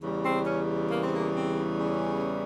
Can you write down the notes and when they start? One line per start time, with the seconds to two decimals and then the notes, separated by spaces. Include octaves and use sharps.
0.01 E2 C#3 E3 G3
0.23 C4
0.45 C#4
0.90 A#3
1.02 C4
1.14 A#3
1.34 C4
1.78 C#4